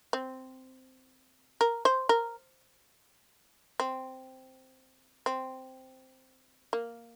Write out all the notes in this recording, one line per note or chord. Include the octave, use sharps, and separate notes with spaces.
C4
A#4
C5
A#4
C4
C4
A#3